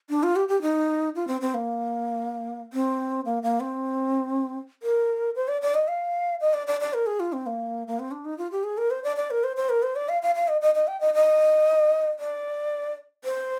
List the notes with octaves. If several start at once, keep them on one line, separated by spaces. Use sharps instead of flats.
D4
F4
G4
G4
D#4
F4
C4
C4
A#3
C4
A#3
A#3
C4
A#4
C5
D5
D5
D#5
F5
D#5
D5
D5
D5
A#4
G#4
F4
C4
A#3
A#3
C4
D4
D#4
F4
G4
G#4
A#4
C5
D5
D5
A#4
C5
C5
A#4
C5
D5
F5
F5
F5
D#5
D#5
D#5
G5
D#5
D#5
D5
C5